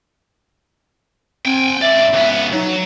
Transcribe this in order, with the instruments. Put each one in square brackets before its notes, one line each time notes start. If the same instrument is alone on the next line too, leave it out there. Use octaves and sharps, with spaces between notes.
[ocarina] C4 [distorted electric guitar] G5 G#5
[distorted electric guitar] C#2 D5 [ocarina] E5
[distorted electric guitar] C#2 B3
[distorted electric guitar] F#3 [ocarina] D#4